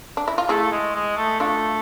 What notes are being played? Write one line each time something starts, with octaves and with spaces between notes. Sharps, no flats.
D4
E4
F4
A3 E4 G#4
G#3
G#3
A3
A3 D4 F4